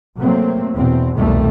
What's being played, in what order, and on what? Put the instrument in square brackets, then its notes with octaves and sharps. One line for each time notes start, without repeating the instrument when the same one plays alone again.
[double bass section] C3 F#3 A3 A#3 C4
E2 B2 C4
C2 F2 B2 D#3 G3 A3